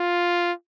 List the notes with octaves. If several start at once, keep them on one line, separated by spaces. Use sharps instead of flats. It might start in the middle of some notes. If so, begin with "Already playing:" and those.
Already playing: F4